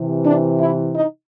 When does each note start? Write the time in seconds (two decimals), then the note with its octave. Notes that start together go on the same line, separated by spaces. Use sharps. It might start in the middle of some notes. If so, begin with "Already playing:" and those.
Already playing: C3 E3
0.26 D4
0.60 E4
0.96 D#4